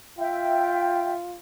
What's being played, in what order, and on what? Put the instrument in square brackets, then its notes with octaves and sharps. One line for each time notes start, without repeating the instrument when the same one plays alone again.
[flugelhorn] F4 [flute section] E5 G5